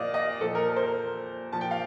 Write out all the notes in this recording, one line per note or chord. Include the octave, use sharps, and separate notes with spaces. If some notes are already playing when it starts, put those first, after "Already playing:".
Already playing: A#2 F3 D5 D#5 F5
D#5
A#2 F3 A4
A#4
A#4
C5
A#4
A#2 F3 A5
G5
F5